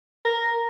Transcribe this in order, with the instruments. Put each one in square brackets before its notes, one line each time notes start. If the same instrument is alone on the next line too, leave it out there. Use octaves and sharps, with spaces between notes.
[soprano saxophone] A#4